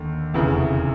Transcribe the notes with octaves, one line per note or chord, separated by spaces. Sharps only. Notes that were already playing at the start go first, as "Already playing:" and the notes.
Already playing: D#2 D3
F1 E2 C#3